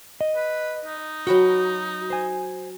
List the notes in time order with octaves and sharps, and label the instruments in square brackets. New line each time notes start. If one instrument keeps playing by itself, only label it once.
[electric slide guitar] D#5
[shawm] B4
D#4
[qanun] F#3 B4 G5 [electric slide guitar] F#4
[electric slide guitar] C5 G#5